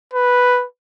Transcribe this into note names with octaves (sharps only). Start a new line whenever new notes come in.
B4